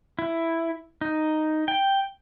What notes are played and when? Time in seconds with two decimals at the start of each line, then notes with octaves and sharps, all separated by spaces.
0.19 E4
1.01 D#4
1.68 G5